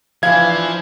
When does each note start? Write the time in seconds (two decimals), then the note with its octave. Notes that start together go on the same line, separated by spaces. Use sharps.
0.23 E3 F3 D4 F5 G#6